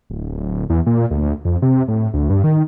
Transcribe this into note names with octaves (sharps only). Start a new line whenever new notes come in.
D1
E2
A#2
D2
F2
C3
A2
D2
G2
D#3